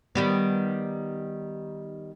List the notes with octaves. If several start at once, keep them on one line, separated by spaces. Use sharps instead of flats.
D#3 G3 B3